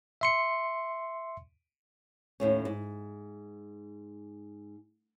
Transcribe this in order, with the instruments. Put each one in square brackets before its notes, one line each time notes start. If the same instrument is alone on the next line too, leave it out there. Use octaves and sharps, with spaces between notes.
[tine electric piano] E5 C6 C#7
[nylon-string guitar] D#2 A2 C#4
G#2